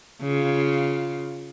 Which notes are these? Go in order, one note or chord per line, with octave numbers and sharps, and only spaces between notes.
C#3 F4